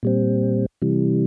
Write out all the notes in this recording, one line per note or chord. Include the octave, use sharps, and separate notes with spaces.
A#2 G3 C4
C3 E3 G3